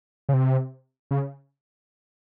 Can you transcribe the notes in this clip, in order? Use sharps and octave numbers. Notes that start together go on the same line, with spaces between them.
C#3
C3
C#3